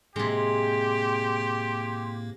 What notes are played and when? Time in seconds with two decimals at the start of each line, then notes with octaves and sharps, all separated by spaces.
0.16 A2 C3 G#3 A#3 G4 C6